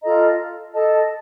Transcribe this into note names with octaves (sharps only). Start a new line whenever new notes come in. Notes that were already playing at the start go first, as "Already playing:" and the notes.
F4 A4 D#5 A#5
A4 D#5 A5